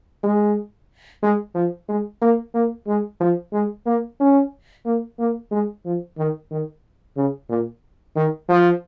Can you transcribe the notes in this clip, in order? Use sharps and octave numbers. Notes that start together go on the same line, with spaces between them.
G#3
G#3
F3
G#3
A#3
A#3
G#3
F3
G#3
A#3
C#4
A#3
A#3
G#3
F3
D#3
D#3
C#3
A#2
D#3
F3